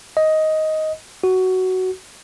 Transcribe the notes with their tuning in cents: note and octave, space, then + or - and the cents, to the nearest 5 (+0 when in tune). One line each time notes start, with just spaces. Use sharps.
D#5 +10
F#4 +10